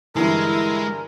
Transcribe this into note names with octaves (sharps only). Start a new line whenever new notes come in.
G2 D3 E3 G#3 E4 A#4